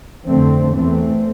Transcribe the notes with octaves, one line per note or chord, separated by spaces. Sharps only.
F2 D3 A3 C4
E2 E3 A3 C4